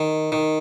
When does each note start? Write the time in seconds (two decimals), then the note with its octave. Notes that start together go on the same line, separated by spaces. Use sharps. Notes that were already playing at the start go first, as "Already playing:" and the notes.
Already playing: D#3
0.32 D#3